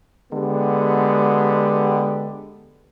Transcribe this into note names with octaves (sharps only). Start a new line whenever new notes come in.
D3 G#3 B3 G4